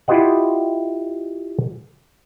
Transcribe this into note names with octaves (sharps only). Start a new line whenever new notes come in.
E4 F4 G4 C5 D#5 F#5